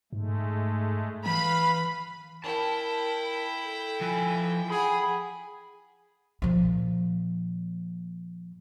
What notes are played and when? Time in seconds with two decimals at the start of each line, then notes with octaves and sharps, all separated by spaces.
0.13 G#2 G#3 A3
1.26 E3 B4 F5 B5
2.44 E4 A#4 G5 A5
3.64 A4
4.01 F3 G#5
4.71 G#4 F#5 B5
6.42 A#2 F3